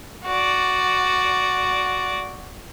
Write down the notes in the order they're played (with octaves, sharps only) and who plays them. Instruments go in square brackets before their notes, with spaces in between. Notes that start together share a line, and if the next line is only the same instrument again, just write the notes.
[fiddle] F#4 D5